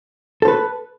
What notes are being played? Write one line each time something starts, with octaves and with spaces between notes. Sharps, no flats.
A4 B4 C5